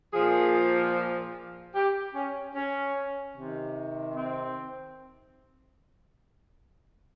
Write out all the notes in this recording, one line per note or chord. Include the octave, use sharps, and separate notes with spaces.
A#2 F3 G#4
G4
C#4
C#4
C3 D#3
C4